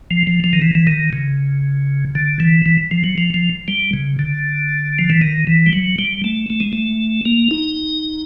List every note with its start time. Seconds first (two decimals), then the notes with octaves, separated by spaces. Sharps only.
0.11 F3
0.27 F3
0.44 F3
0.53 D#3
0.62 E3
0.75 E3
0.87 D#3
1.13 C#3
2.15 D3
2.40 E3
2.66 E3
2.91 F3
3.04 F#3
3.18 F3
3.34 F3
3.68 G3
3.93 C#3
4.19 D3
4.99 F3
5.10 E3
5.22 D#3
5.47 E3
5.66 G3
5.73 F#3
5.99 G3
6.24 A3
6.50 A3
6.60 G#3
6.73 A3
7.25 A#3
7.51 D#4